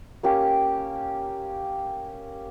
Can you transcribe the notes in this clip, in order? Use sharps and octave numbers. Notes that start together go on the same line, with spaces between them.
A#3 C#4 G4